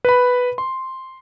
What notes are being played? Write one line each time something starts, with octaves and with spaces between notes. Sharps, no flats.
B4 B5
C6